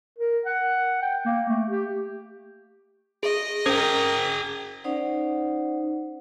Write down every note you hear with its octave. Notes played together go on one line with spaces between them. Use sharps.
A#4
F#5
G5
A#3
A3
G4
G#4 D#5
C#4 G#4 A#4 C5 G5
C#4 D#4 C5 D5 F#5